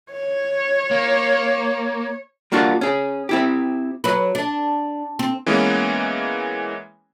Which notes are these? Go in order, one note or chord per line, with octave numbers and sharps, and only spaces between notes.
C#5
A#3
G3 A#3 D4 F4 F#4
C#4 G#4
C4 E4 G4
F#3 B4
D4
C4
E3 G#3 A#3 B3 C#4